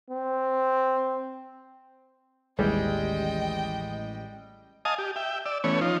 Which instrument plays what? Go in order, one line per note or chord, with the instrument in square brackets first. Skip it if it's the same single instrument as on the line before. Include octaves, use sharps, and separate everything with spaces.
[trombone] C4
[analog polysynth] A1 [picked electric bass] D#2 [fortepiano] G3 G#3 G4 [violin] D#5 G5
[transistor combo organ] D#5 F5 G#5 A5 D#6
G4
E5 G5
D5 E6
E3 A3 B3 C#4 C#5
F3 D#4 F4